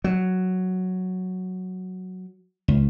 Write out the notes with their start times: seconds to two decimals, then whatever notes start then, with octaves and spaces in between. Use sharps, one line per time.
0.04 F#3
2.68 C#2